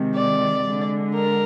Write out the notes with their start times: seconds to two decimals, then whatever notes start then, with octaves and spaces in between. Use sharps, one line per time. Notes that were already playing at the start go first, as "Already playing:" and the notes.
Already playing: C3 D#3 G#3
0.14 D5
0.65 D3 G#3
1.14 A#4